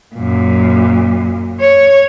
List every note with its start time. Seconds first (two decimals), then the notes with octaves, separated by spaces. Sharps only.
0.16 F#2 A#2
1.60 C#5